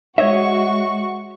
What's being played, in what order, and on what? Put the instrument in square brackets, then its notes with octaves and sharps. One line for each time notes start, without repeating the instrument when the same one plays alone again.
[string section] G#3 F#4 C#6 [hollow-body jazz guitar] C#5 D#5 E5